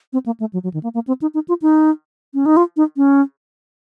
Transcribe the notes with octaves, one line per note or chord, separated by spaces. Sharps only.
C4
A#3
A3
F#3
F#3
D#3
A#3
A#3
C4
D#4
D#4
F4
D#4
C#4
D#4
F4
D#4
C#4